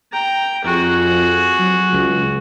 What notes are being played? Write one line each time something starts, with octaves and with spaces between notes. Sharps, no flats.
G5 A#5
F2 F#4 G#4
F#3
C#2